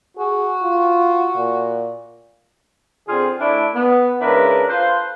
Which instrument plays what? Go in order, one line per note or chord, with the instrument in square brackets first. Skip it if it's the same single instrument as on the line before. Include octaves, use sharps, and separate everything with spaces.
[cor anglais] F#4 [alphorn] G#4
[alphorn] F4
A#2
[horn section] D3 C4 F4 G#4
A3 D4 E4
B3
C#3 G#3 D4 E4 A#4 B4
F4 A4 B4 C5